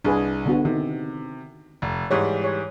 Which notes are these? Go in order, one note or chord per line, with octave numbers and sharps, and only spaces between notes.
C2 D4 G#4 B4
D3 B3 F#4
C3 D#3
F1
G#2 E3 G3 C#5
C#5